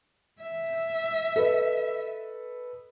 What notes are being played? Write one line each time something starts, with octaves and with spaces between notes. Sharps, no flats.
E5
A4 B4 D#5